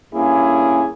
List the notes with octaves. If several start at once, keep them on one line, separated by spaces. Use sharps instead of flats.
G2 A#3 C#4 E4 G#4